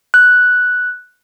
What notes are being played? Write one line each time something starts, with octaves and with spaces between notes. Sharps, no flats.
F#6